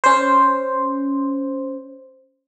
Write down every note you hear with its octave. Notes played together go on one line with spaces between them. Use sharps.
C#4 C5